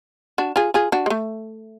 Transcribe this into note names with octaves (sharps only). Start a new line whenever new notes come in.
D4 F#4
F4 G#4
F4 G#4
D4 F#4
G#3
A3